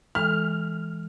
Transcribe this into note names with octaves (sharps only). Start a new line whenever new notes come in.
E3 G#3 A4 F6